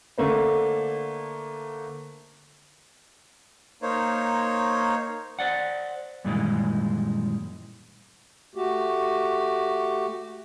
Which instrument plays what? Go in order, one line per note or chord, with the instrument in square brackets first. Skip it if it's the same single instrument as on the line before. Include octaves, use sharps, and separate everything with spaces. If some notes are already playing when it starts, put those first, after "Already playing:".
[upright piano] D3 A3 A#3 C5
[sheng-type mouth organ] A#3 D#4 C5 C#5
[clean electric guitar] C5 D5 F#5
F#2 A#2 D#3 E3 G3 G#3
[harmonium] A3 F#4 G4